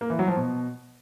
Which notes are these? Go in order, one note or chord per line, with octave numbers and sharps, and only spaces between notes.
A#3
E3
F#3
F3
B2